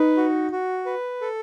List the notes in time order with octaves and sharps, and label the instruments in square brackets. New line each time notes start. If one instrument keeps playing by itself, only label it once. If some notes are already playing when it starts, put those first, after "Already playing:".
Already playing: [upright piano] D#4 [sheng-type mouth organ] B4
[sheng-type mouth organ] F#4
F#4
B4
A4